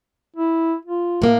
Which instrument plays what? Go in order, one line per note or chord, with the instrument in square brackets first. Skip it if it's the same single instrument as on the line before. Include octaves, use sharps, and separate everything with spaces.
[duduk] E4
F4
[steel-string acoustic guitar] A2 A#3